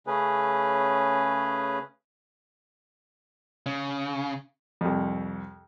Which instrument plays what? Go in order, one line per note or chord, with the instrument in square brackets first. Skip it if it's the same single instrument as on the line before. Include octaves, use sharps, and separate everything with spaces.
[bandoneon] C#3 A3 C#4 G#4 B4
[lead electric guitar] C#3
[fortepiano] C2 F2